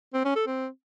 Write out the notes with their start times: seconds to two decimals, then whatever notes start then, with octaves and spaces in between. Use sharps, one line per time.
0.14 C4
0.25 C#4
0.36 A4
0.47 C4